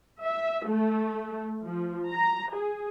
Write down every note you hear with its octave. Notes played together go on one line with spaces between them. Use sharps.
E5
A3
F3
A#5
G#4